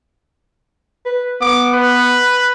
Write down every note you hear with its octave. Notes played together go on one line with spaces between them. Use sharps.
B4
B3 D6
B4